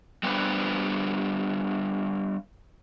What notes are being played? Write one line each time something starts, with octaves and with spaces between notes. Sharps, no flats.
G3 B3 D4 B4 C5